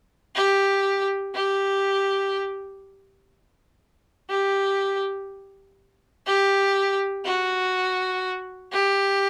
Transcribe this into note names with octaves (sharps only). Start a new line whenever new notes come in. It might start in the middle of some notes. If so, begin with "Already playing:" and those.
G4
G4
G4
G4
F#4
G4